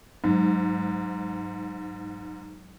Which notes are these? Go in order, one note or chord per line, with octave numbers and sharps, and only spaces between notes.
G#2 F#3 G#3